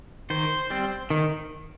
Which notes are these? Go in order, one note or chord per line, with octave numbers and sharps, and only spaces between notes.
D#3 C5
G3 C4
D#3